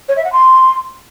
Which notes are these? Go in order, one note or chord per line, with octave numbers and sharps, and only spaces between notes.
C#5
E5
F#5
C6